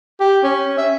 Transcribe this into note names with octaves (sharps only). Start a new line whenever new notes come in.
G4
C#4
E5